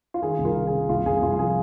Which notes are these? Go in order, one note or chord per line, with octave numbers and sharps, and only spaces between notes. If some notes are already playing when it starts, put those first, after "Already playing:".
F4
D#3 G#4
C2
F4 A#4
D#3
G#4
C3
C2 F4
C2 G#4
C2 F4
F3 G#4